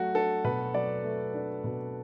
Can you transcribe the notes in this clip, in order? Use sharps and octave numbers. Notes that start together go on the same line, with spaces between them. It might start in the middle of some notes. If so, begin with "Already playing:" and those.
Already playing: F#3 A3 F#4
D4 A4
B2 B4
F#3 D5
A3
D4
B2